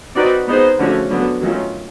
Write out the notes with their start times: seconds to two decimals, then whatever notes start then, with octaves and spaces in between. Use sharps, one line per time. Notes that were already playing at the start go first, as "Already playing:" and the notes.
0.15 C4 D#4 F#4 B4 D5
0.47 B3 D#4 G#4 C5
0.79 D3 F3 A3 C#4 F#4
1.10 D3 F#3 B3
1.41 D#3 F#3 A3 C#4 F4